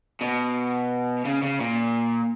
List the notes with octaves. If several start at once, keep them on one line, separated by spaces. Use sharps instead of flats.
B2
C#3
C#3
A#2